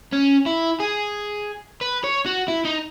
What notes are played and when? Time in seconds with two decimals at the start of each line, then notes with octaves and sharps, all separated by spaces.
0.12 C#4
0.46 E4
0.80 G#4
1.81 B4
2.04 C#5
2.26 F#4
2.48 E4
2.65 D#4